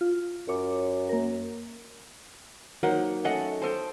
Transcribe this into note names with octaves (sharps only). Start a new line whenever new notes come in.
F4
F#2 C#5 D6
A#3 A#4
F#3 A#3 D#4 A#4 C5 F#5
A3 C#4 A4 D#5 F#5
A4 C5 D#5 G5 A5